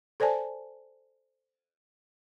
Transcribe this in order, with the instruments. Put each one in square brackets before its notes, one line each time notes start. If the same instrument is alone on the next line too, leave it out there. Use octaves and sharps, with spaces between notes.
[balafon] A4 C5 D5 G#5 A5